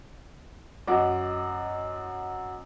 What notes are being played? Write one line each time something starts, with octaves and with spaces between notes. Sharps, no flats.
F#2 F#4 D#5 D6